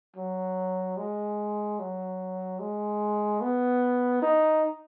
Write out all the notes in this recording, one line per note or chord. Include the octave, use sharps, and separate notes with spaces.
F#3
G#3
F#3
G#3
B3
D#4